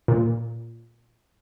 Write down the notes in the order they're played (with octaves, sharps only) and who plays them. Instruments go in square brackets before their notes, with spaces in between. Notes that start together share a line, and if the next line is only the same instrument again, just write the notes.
[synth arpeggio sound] A#2